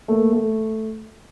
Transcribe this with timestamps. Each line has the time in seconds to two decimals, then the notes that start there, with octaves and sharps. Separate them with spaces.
0.08 A3 A#3
0.33 A3